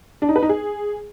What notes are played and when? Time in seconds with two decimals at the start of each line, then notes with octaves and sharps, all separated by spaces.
0.22 D4
0.29 D#4
0.36 B4
0.42 D#4
0.49 G#4